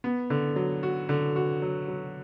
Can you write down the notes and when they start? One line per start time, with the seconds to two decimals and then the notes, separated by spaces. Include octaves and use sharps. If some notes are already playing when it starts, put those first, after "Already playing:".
0.04 B3
0.30 D3
0.56 F#3
0.83 F#4
1.09 D3
1.36 F#4
1.62 F#3
1.88 F#3